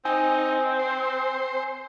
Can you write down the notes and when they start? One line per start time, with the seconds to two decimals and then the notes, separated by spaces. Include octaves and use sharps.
0.05 C4 D#4 G#5
0.79 C5